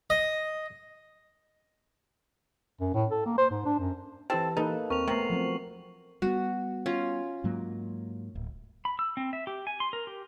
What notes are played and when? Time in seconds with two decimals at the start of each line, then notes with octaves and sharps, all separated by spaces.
0.10 D#5
2.81 F#2
2.94 A2
3.11 A4
3.26 A#3
3.38 C5
3.50 G#2
3.65 D4
3.79 F#2
4.30 E3 C4 E4 G4 A4
4.57 A#3 D#4 A4 B4
4.90 D#2 C4 A#4 C#6 F7
5.08 C3 A3 B3 A#4 C7 F#7
5.30 F3 F#3 C4
6.22 G3 A3 B3 F#4
6.86 C#4 F4
7.44 G#2 F#3 A#3
8.35 D1
8.85 B5
8.99 E6
9.17 C4
9.33 E5
9.47 G4
9.67 G#5
9.80 C6
9.93 A#4
10.07 G4